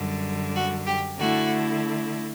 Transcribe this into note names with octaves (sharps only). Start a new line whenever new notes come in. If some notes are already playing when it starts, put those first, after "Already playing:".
Already playing: F#2 D3 G3
F#4
G4
D3 A3 E4 F#4